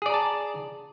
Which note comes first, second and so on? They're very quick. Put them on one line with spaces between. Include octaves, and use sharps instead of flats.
G#4 D5 A#5 A5